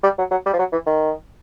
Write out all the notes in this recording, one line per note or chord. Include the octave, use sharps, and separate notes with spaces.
G3
F#3
F#3
G3
F3
F#3
E3
D#3